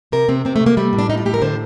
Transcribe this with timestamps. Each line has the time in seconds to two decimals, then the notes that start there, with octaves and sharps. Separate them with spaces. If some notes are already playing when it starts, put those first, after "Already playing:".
0.12 C3 A#4
0.29 C3 C4
0.45 C3 C4
0.56 A3
0.61 C3
0.66 A#3
0.77 G3 A3
0.93 A2
0.99 D4
1.09 G3 D#4
1.18 F4
1.25 A2 G4
1.34 A#4
1.42 D3 C5